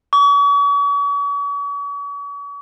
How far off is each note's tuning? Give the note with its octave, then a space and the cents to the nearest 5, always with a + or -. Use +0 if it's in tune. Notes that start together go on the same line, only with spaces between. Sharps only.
C#6 +40